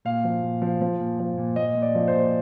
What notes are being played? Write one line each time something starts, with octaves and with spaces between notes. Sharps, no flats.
A#2 F5
F3
A#2
F3
F3
A#2
F3
A#2
A#2 D#5
A#2
D5
F3
C5
A#2